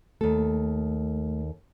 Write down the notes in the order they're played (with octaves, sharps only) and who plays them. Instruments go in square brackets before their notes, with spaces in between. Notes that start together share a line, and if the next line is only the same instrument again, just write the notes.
[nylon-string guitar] D#2 A4 [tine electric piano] A3